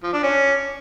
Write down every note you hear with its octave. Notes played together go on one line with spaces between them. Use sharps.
F3
D4
C#4